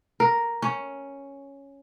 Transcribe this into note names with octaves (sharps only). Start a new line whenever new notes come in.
A#4
C#4